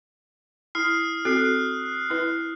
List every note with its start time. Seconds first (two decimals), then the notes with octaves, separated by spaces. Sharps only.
0.75 E4 D#6 F6 C7
1.25 C4 F#4 A4 F#6 C7
2.10 E4 B4